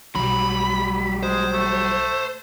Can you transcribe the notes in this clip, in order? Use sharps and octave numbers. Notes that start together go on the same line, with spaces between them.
B1 F#3 G3 B5
G#3 C5
A3